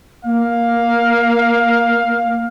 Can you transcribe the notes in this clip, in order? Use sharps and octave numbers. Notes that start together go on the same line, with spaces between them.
A#3 F5